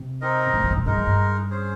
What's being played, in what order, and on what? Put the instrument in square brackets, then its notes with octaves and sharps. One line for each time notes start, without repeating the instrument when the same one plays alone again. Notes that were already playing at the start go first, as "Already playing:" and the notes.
Already playing: [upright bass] C3
[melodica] C4 D#4 A#4 D#5
[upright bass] A#2
C3
G#2
A#2
[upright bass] G2 [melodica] G#3 D#4 A#4
[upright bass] F2
G2
[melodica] C#4 G#4 C5